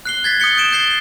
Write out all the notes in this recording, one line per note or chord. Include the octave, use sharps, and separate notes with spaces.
F#6 C7 G7
G#6 A6 B6
D#6 G6 C#7 G7
G6 D7 E7 G7
G6 A6 C7 G7